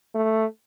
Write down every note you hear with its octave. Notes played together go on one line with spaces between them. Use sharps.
A3